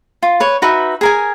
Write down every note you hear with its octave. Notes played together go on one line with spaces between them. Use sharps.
F4
B4 C#5
D#4 F#4 B4 E5
G#4 A#4 G#5